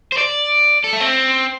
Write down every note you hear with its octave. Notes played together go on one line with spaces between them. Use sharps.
C5
D5
A4
A3
C4